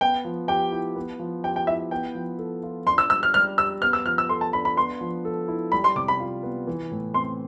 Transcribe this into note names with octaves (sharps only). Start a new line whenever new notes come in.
B3 G5
F3
G4 G5
E4
B3
F3
G4 G5
G5
E4 E5
B3 G5
F3
A4
F4
D4 C6
E6
G3 E6
F6
G3 F6
G4 E6
B3 F6
E6
F3 F6
E6
A4 C6
A5
D4 B5
B5
B3 C6
F3
A4
E4
G3 B5
C6
C3 D6
B5
F4
B3
E3
A2
C4 C6